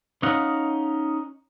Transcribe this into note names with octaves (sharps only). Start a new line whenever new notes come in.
C#4 D#4 D#5 F5 F#5